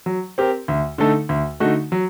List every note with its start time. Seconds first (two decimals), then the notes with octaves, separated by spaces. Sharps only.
0.06 F#3
0.38 C4 G4 A#4
0.68 D2
0.98 D3 A3 D#4 A4
1.29 D2
1.60 D3 A3 D#4 F#4
1.92 F#3